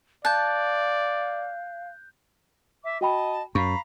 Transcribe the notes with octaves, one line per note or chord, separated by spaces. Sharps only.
D5 F5 A5 F#6 G6
E5 D6
F#4 D#5 G5 A5 B5
F#2 F5 A#5 B5 C#6